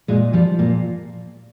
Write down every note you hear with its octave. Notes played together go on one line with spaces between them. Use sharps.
A#2 G#3
F3 G3
A#2 A#3